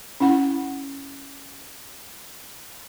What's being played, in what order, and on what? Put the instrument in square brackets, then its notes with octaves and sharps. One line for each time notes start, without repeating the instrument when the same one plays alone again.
[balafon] C#4 E4 F#5